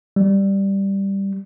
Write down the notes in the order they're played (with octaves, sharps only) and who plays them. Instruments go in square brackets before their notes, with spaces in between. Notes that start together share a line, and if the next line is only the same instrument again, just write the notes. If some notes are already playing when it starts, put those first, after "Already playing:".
[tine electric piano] G3